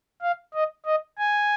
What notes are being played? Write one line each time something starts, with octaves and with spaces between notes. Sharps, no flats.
F5
D#5
D#5
G#5